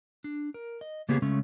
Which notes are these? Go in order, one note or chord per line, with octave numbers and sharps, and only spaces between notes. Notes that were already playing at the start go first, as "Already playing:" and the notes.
D4
A#4
D#5
C#3 A#3 B3 C#4 G4 G#4
C#3 G#3 A3 C#4